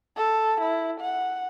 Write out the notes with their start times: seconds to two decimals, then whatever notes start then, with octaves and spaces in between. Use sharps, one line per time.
0.16 A4
0.61 E4
1.01 F#5